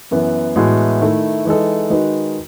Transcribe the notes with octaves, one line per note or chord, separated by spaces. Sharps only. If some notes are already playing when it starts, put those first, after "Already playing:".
F#2 E3 B3
A2 E3 G#3 B3 F#4
D#3 A3 E4
E3 G#3 D#4 A4
D#3 G#3 D#4 F#4 B4